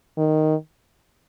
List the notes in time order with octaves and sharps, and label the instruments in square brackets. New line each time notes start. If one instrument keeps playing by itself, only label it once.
[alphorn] D#3